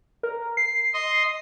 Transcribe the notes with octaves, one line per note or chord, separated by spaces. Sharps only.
A#4
C7
D#5 C6